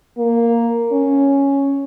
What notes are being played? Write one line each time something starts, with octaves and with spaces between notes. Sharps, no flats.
A#3
C#4